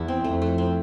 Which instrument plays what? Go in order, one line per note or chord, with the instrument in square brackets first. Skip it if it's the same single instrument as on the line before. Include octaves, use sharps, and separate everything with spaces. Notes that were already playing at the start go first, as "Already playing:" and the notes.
Already playing: [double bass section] E2 [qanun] E4
[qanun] C4
[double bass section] F2 [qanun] A3
[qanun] A3
C4